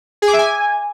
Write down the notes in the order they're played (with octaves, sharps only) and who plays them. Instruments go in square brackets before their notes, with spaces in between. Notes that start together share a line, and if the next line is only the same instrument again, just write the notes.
[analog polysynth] G#4
D6
E5
G#5